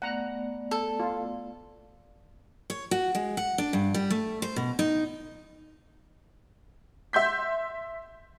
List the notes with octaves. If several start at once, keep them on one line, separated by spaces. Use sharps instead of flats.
A3 B3 D5 F#5 A#5
A4
F4
C#5
F#4
G#3
F#5
D4
G2
G3
A3
C5
B2
D#4
E5 C6 G6 B6